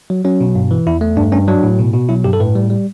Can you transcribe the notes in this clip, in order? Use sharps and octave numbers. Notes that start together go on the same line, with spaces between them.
F#3
F#3 C#4
B2
G2
E3
E2 E4
A3
G2 D4
G2 C#4
F#3 D4
A2
B2
B2
F#3 E4
G2 G4
A4
A2 B4
G3
G3